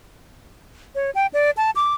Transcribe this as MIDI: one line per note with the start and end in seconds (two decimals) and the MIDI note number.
0.95 1.11 73
1.15 1.27 79
1.33 1.51 74
1.57 1.71 81
1.76 1.94 86